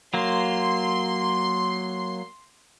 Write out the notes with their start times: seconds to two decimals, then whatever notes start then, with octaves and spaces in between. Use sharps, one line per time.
0.14 F#3 A#3 C6